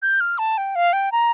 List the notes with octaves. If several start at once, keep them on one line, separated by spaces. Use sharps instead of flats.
G6
F6
A5
G5
F5
G5
A#5